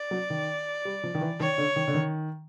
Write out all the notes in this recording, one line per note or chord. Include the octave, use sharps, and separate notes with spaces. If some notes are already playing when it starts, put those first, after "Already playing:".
Already playing: D5
F#3
D#3
G3
F3
D#3
E3
D#3 C#5
D3
D#3
D3
D#3